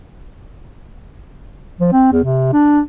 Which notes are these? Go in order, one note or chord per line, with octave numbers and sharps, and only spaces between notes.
F3
C4
E2
C3
D4